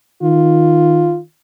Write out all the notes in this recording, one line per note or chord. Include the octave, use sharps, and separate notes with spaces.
D#3 F4